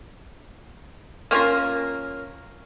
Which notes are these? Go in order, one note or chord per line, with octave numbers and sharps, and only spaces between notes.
A#3 C#4 F4 A#4